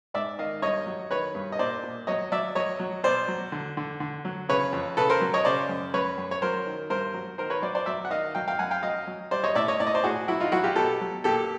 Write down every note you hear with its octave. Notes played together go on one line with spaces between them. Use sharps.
G#2 D5 E5
D#3 D#5 F5
G2 C#5 D#5
F#3
D#3 B4 C#5
G2
D#5
A#2 C5 D5
A#2
F#3 C#5 D#5
F#3 D5 E5
F#3 C#5 D#5
F#3
B2 C5 D5
F#3
D3
D3
D3
F#3
C#3 B4 C#5
F2
C#3 A4 B4
A#4 C5
F#3
C#5 D#5
C#3 C5 D5
F#2
F#2 B4 C#5
F#2
C#5
F#3 A#4 C5
D#3
G2 A#4 C5
F#3
D#3 A#4 C5
B4 C#5
F#3 C5 D5
C5 D5
F#3 D5 E5
F#5
D#3 D#5 F5
F#3 F5 G5
F5 G5
F#2 F#5 G#5
F5 G5
F#3 D#5 F5
F#3
G3 C5 D5
C#5 D#5
A2 D5 E5
C#5 D#5
A2 D5
D#5
C5 D5
A2 F#4 G#4
F#3 E4 F#4
D#4 F4
F#3 E4 F#4
F4 G4
B2 G4 A4
F#3
A#2 G4 A4